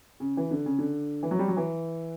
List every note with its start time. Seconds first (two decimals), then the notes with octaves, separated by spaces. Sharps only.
0.20 C#3
0.37 E3
0.51 D3
0.66 C#3
0.79 D3
1.23 E3
1.31 F#3
1.39 G3
1.48 F#3
1.57 E3